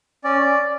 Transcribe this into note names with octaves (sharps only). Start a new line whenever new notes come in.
C#4 D5